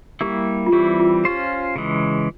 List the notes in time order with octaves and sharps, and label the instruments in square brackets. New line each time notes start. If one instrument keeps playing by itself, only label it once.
[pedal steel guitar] G3 A#3 E4 [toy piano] G4
[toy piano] F4
[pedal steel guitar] E3 G3 C4 E4 [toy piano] G4
[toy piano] F4
[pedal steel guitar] C#4 F4 C5 [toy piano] G4
[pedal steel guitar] C#3 E3 G#3